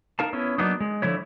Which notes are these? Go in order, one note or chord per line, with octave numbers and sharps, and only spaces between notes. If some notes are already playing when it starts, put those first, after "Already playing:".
D#4 A#4 F5 A5
B3 C#4 E4
F#3 A#3 B3 D4 D#4
G#3
D3 F3 A3 E4 C#5